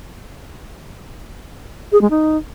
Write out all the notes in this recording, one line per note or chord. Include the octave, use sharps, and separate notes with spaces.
G#4
G#3
D#4